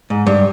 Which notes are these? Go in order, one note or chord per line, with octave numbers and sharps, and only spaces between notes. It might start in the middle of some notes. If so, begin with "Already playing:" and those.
G#2
G2